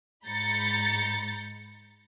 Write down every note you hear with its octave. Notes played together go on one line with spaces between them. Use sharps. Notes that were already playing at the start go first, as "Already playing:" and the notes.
G#2 A#5 B5 G6 A6 C#7